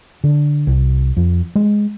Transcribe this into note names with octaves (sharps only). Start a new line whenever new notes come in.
D3
C2
F2
G#3